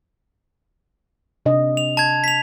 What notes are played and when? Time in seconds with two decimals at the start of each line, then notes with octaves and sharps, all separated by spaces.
1.46 C3 D4 D#5
1.77 F7
1.97 A5 G#6
2.24 B6 F7